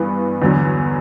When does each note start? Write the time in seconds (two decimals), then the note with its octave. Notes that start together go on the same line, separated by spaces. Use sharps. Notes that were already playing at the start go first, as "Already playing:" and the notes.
Already playing: G2 E3 B3
0.42 E2 D3 F#3